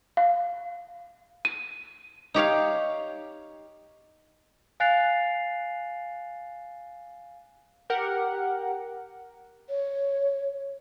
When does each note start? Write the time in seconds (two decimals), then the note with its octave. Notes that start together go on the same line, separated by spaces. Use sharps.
0.17 F5
1.45 D#7
2.34 D#4 G4 C#5 F5
4.80 F5 G#5 F#6 A6 C7 F7
7.90 G4 A#4 F#5
9.69 C#5